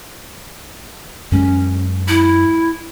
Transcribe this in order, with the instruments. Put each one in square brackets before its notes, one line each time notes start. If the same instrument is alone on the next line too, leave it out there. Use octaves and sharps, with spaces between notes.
[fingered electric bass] F#2 G#3 [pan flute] C#4
[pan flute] E4